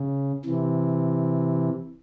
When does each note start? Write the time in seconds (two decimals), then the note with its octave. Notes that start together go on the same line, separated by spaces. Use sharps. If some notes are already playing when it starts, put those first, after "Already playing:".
Already playing: C#3
0.45 C3 E3